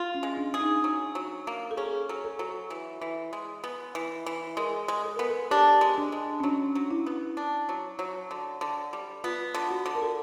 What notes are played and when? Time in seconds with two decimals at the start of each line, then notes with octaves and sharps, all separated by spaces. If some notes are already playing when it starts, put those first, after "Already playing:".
Already playing: F4
0.15 C#4
0.23 G#3
0.37 D4
0.54 G#4
0.61 D#4
0.84 F#3
1.15 F#3
1.47 A#3
1.71 A4
1.77 C#4 G#4
2.09 F#3
2.24 A4
2.39 F#3
2.70 E3
3.01 E3
3.33 G#3
3.64 B3
3.95 E3
4.26 E3
4.57 G#3 A#4
4.88 G#3
5.04 A4
5.16 B3 A#4
5.29 A4
5.51 D4 G4
5.81 G#3
5.98 D4
6.12 G#3
6.40 C#4
6.43 F#3 D4
6.75 F#3
6.91 E4
7.06 B3
7.37 D4
7.69 F#3
7.99 F#3
8.31 D3
8.61 D3
8.93 G3
9.24 B3 F4
9.54 D3
9.71 F#4
9.86 D3
9.95 A#4
10.02 A4